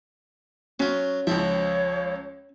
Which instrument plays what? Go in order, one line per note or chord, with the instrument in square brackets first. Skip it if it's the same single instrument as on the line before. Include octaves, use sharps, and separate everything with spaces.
[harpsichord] F#3 F4 [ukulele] C#4
[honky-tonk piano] C#2 F3 [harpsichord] C4 E5 [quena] C#5